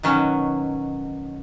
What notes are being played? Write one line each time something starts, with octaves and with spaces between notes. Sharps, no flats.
B2 D#3 F#3 C#4